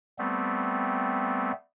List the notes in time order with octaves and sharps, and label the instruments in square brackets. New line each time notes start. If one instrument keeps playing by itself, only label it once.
[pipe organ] G3 A3 B3 C4